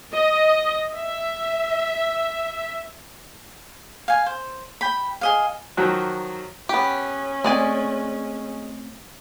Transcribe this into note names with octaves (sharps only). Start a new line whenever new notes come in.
D#5
E5
F5 G#5
C5
G5 B5
G#4 D#5 F5
D#3 F3 F#3 F#4
B3 C#4 G4
G#3 A3 C4 D5 G#5